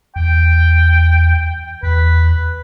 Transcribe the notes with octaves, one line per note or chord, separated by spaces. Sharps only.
E2 G5
E2 B4